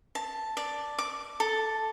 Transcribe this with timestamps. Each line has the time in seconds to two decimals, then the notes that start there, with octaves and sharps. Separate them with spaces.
0.15 A5
0.57 D5
0.98 D6
1.40 A4